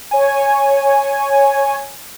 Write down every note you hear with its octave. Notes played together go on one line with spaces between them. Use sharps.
C#5 G#5